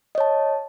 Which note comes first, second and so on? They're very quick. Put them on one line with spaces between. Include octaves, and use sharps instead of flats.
D#5 C#5 A5